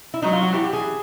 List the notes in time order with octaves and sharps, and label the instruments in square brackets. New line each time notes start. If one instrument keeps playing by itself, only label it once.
[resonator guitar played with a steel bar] E4
[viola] F#3 [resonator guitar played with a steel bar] D#4
[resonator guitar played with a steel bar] F4
F#4
[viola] E3 [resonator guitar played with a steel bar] G4
[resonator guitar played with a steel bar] G4
G#4